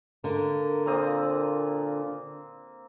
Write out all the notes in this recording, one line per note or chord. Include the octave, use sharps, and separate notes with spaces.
D3 A#3 A#4
A#2 A#3 C4 D#6